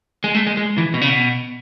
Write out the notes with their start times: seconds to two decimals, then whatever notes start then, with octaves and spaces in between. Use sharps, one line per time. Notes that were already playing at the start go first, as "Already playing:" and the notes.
0.24 G#3
0.35 A3
0.47 G#3
0.57 G#3
0.78 E3
0.94 B2
1.01 C#3
1.09 B2